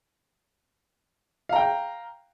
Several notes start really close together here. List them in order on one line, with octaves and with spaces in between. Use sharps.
F5 A#5 G5